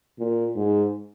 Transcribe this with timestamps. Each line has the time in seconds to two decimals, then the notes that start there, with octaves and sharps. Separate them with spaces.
0.19 A#2
0.56 G#2